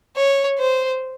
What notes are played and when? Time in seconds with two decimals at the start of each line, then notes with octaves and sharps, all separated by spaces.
0.16 C#5
0.59 C5